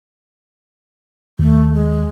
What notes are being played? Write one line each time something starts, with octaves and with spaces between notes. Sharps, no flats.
D#2 A3
G#3